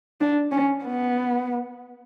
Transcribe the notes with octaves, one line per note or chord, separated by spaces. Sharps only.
D4
C#4
B3